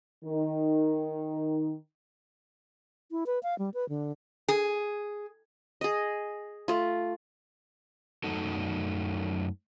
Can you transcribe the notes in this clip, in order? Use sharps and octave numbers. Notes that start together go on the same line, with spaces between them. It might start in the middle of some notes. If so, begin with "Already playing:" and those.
D#3 D#4
E4
B4
F5
G3
B4
D3
G#4
G#4 D#5
A3 F4
F#2 A3 D#4 F#4 A4